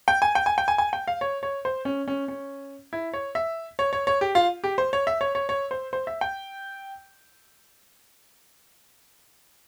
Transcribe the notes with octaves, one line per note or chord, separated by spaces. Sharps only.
G5
G#5
G5
G#5
G5
G#5
G#5
G5
F5
C#5
C#5
C5
C#4
C#4
C#4
E4
C#5
E5
C#5
C#5
C#5
G4
F4
G4
C5
C#5
E5
C#5
C#5
C#5
C5
C5
E5
G5